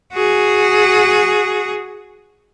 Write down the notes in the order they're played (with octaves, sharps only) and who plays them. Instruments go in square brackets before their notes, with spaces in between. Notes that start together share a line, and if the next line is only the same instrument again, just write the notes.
[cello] F#4 G#4